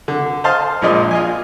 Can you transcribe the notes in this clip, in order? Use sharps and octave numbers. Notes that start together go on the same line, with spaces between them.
D3
C5 D#5 F5 A5 C6
A#1 A#2 F3 G#3 D5 D#5
F4 D#5 G#5